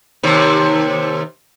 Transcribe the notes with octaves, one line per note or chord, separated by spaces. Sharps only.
D#2 C3